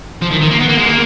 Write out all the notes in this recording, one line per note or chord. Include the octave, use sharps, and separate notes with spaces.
F3
D#3
D#3
A#3
B3
A#3
G#3
A#3